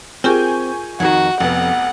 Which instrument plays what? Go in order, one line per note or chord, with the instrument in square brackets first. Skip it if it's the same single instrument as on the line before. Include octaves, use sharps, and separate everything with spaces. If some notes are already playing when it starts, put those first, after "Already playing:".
[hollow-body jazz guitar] C4 G4 [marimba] F4 G#4 A#4 [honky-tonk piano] G#5 C#6 G6
[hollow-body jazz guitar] F2 D#3 D#4 [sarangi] F#4 [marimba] G#6
[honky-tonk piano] F1 B3 [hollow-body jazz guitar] F2 [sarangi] F#5